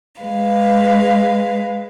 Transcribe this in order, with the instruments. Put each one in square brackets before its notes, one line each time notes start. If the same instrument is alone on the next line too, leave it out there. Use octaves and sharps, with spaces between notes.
[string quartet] G#3 B4 F5